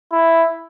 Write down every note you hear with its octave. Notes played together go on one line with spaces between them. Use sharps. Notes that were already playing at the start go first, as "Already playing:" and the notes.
E4